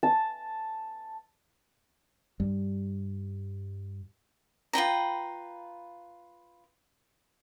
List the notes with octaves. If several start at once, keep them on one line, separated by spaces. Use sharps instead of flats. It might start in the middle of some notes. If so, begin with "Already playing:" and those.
A5
G2 G3
F4 B4 G5 A#5